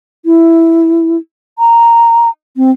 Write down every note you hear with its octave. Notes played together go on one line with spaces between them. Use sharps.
E4
A#5
C4